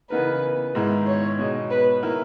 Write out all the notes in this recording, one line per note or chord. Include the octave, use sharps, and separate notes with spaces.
C#3 E3 B3 D#4 A#4 B4
G#2 D#3 G#3 B3 E4
C#5
B2 G#3 D#4
B4
D#3 A#3 E4 A#4